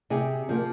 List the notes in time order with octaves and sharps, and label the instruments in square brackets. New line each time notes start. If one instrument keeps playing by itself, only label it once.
[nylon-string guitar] C3 G#4
F3 A#3